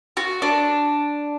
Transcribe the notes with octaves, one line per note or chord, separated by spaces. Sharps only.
F#4
D4